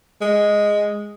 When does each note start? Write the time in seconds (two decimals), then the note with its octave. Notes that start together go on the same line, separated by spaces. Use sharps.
0.21 G#3